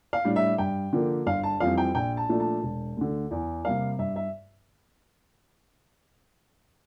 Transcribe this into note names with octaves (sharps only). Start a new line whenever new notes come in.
F5
A2 G3 D4
E5
G2 G5
D3 F3 A#3
G1 F5
A5
F2 E3 G3 C4 F5
G5
A#1 G5
A5
A#2 F3 A3 D4
A5
E1
D2 D3
E2
C3 G3 A#3 F5
G2 E5
E5